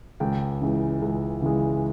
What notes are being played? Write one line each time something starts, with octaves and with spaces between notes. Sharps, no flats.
C#2 G5
C#3 E3 G#3
C#2
C#3 E3 G#3